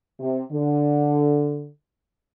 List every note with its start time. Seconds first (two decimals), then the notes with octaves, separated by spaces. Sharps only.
0.19 C3
0.52 D3